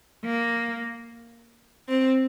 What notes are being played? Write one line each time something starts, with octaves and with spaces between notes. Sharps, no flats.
A#3
C4